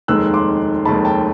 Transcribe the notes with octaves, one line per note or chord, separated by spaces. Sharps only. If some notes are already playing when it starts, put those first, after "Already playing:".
F1 D#2 D#3 G#3 E6 F#6
C6 D6
F1 D#2 D#3 G#3 A5 B5
G5 A5